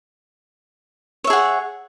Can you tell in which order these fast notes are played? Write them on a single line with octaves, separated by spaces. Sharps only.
C#5 E5 G#4 F#5